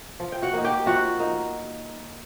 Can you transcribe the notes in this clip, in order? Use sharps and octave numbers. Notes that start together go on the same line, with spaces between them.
F3
G5
F#4 F#5
A#3 D#4
G4 G5
F3 F#4 F#5
A#3 D#4